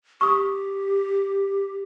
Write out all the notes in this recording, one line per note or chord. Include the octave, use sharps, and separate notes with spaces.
G4 C#6 D#6